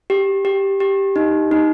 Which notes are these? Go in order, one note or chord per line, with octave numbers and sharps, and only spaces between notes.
G4
G4
G4
D#4
D#4